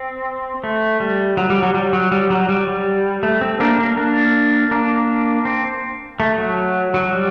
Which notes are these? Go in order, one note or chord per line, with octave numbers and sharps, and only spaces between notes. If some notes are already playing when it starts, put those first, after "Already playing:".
Already playing: C4
A3
G3
F#3
G3
F#3
G3
F#3
G3
F#3
G3
G3
A3
C4
A#3 D4
A#3
A#3 D4
A#3 D4
C4
A3
F#3
F#3
G3